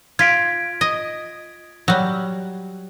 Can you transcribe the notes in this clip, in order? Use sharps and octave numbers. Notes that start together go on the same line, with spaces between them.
F4 G#6 B6 D7
D#5
F#3 G3